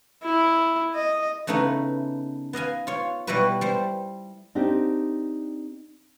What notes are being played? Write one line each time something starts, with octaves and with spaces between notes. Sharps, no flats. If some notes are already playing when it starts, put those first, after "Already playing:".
E4
D#5
C#3 A3 B3 D#4 E4
B3 D#5 F5 G#5
F4 C#5
B2 G3 E4 F#4 G4 B4
G3 C5
C4 D4 D#4 G4